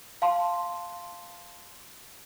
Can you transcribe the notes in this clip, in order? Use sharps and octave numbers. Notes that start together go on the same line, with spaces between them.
F5 A5 C6